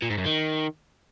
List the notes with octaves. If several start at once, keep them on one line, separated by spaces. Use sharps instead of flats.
A#2
G#2
F#2
D#3